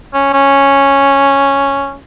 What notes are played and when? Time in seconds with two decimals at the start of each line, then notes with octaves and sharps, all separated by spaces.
0.14 C#4
0.33 C#4